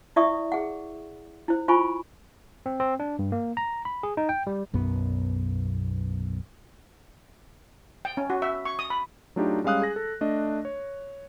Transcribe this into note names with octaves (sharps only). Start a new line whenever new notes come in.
E4 D5 E5 C#6 D#6
G#4 F#5
E4 C5
F4 C5 G#5 B5 C#6
C4
C4
D4
G2
A#3
A#5
B5
G#4
D#4
G5
G3
B1 F#2 B3
G5
C#4
F#4
E5
C#6
D#6
B5
F#3 A3 D4 D#4 F4 G4
G3 G#3 C#4 F5 D#6 F#6
G#4 A#6
A4
A3 D4 D#5
C#5